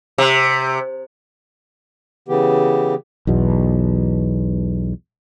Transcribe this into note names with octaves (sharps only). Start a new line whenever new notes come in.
C3
C#3 E3 B3 G4
B1 E2 B2